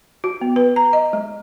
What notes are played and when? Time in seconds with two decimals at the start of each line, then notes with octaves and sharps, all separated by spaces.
0.24 F#4
0.41 B3
0.56 B4
0.76 A#5
0.93 D#5
1.13 G#3